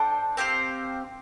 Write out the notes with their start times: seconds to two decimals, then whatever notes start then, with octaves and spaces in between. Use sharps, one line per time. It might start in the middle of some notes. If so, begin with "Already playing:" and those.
Already playing: D4 A4 C5 G5
0.37 C4 G4 C5 F5